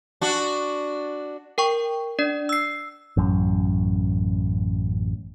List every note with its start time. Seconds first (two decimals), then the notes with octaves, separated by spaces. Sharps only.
0.21 D4 F#4
1.58 A#4 G5 C#6
2.19 D4 D5
2.49 E6 C7
3.17 A1 F#2